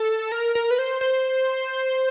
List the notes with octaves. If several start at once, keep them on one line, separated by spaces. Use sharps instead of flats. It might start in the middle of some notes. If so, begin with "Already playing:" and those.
Already playing: A4
A#4
A#4
B4
C5
C5